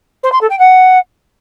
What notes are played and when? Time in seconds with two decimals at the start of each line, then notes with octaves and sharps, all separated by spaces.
0.23 C5
0.32 C6
0.41 A4
0.50 G5
0.59 F#5